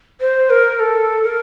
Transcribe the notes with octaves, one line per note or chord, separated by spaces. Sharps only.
C5
A#4
A4
A#4